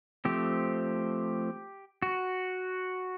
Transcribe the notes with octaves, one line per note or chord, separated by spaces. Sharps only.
F3 A3 C4 G4
F#4